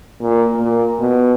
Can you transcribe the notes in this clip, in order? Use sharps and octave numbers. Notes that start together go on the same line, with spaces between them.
A#2
A#2
B2